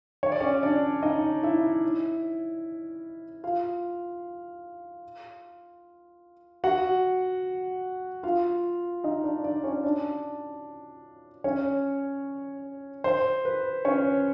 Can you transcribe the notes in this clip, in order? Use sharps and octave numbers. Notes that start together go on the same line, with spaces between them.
C#5
D5
C#4 C#5
D4 D5
D#4 D#5
E4 E5
F4 F5
F#4 F#5
F4 F5
D#4 D#5
D4 D5
D4 D5
C#4 C#5
D4 D5
C#4 C#5
C5
B4
C#4 C#5